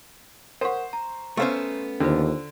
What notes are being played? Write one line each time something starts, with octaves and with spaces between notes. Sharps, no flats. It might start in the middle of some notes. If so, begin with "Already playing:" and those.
A#4 C5 F#5 C#6
A#5
A3 B3 C#4 C5 F5 C#6
D#2 D3 D4 F4 C5